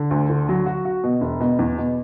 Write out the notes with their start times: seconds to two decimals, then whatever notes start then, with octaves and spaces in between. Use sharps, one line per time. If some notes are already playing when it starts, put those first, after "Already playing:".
Already playing: D3
0.11 D2
0.30 D3
0.49 F#3
0.66 F#4
0.85 F#4
1.04 B2
1.21 E1
1.40 B2
1.59 E2
1.78 B2